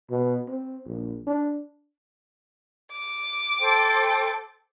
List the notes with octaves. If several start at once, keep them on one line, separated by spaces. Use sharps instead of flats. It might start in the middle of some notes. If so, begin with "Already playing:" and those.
B2
C4
A#1
D4
D6
A4 C5 G5